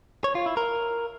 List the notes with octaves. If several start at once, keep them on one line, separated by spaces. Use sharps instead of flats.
C#5
F4
E4
A#4